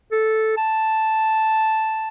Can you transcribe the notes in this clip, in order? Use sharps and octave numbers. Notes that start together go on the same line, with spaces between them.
A4
A5